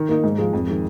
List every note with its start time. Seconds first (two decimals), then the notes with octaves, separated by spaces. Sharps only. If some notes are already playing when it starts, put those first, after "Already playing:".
Already playing: D#3
0.09 A#3 D#4
0.24 G#2
0.39 F3 G#3
0.53 F2
0.67 D#3 G#3